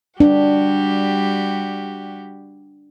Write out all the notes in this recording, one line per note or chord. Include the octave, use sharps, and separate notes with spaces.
G3 D4 F#4 G4